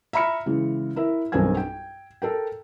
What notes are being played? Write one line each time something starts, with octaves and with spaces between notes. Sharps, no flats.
E5 A#5 B5 F6 C#7
C#3 E3 G#3
E4 A#4 E5
B1 G2 C4 A#4 G#5 G#6
G5
A4 A#4 G5